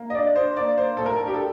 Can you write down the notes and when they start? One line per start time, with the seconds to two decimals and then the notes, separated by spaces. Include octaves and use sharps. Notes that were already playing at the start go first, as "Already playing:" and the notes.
Already playing: A#3
0.10 D#5
0.14 D4 D5
0.36 D4 C5
0.57 A#3 D5
0.78 A#3 C5
0.97 A2 A4
1.06 A#4
1.20 D4
1.28 G4
1.34 A4